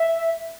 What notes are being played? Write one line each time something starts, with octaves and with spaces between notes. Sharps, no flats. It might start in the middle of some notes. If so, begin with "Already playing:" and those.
Already playing: E5